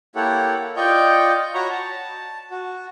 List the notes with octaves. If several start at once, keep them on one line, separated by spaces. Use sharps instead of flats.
A#3 E4 G4 A4 C#5 F#5
F4 D5 D#5 G5 C#6 G6
F#4 C#5 A#5 B5 C#6
A5
F#4